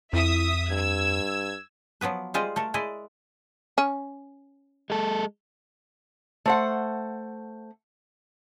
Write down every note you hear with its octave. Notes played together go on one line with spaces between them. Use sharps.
F2 E4 E5 D#6
G2 E6 G#6
F3 F#3 B3 B4
G3 G#3 F4 C5 D#5
A3 A4 A#4
G#3 E4 D5 D#5
C#4
G#3 A4
A3 C5 F#5